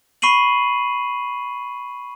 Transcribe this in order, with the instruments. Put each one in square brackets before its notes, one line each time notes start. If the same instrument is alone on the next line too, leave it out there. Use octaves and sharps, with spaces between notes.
[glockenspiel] B5 C#6 C7 D#7 F#7